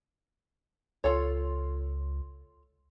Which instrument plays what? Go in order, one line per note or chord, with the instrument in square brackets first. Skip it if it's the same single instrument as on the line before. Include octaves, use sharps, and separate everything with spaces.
[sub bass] C#2 [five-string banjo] F4 A4 C#5